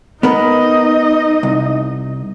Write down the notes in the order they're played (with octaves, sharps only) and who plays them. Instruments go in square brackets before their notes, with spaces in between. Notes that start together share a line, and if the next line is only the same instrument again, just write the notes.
[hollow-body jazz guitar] B3 A#4 B4 [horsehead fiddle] D#4 D#5
[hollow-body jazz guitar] C2